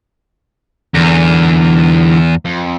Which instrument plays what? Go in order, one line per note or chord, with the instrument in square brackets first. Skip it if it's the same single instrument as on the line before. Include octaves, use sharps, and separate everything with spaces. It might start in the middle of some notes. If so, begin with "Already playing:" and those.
[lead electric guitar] E2 [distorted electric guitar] D3 E3
[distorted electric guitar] F2